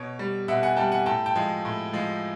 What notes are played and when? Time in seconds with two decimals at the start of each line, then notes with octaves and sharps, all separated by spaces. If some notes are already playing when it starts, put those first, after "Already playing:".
Already playing: B2 C#5
0.19 G3
0.48 B2 E5 F#5
0.63 F#5 G#5
0.77 G3 G5 A5
0.92 F#5 G#5
1.06 A2 G5 A5
1.26 G5 A5
1.35 F3 G#3
1.65 A2
1.93 F3 G#3